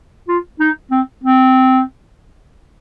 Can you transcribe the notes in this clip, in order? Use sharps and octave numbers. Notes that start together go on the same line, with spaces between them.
F4
D#4
C4
C4